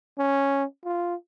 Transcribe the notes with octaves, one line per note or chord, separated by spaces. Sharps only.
C#4
F4